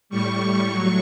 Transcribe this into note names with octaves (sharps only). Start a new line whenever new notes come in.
A2 G3 C#6
A2 F#3 C#6